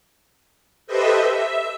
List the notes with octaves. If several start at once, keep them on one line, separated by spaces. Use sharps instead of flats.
G4 A4 B4 C5 D#5 E5
E5